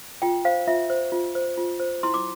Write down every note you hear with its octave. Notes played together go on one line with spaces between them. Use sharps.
F4 G5
C5 F5
F4 E5
C5
F4
C5
F4
C5
E4 C6
D6